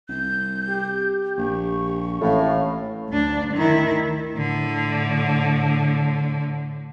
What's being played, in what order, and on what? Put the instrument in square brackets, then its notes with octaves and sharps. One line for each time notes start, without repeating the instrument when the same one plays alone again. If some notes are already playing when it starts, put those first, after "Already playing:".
[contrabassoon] C2 [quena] G6
[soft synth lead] G4
[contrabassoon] A#1 [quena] C#6
[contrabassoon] A1 [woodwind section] A2 [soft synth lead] F5
[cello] D2 D4
D#3 E4
A2 D3